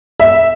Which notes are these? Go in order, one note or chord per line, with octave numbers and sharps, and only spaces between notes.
E5